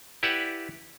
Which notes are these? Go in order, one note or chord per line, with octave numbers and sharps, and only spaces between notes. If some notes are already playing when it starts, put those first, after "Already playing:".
E4 G4 B4 D5 E5 F#5